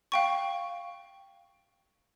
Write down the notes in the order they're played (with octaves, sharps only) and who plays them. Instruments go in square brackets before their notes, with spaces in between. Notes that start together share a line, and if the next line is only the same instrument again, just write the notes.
[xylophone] F5 G5 C#6